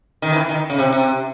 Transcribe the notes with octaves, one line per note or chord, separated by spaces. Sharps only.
D#3
E3
D#3
C#3
C3
C3